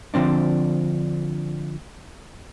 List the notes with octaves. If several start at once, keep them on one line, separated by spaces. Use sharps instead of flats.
D3 F3 C4 D4